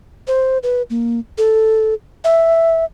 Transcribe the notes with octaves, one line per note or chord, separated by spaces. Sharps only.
C5
B4
A#3
A4
E5